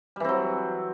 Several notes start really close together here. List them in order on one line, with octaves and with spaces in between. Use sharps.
G3 E3 C4 F#3